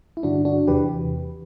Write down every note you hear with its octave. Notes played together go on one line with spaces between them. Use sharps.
E4
G2 D3 D4 F#4
D4 F#4
E2 C3 E3 G4 B4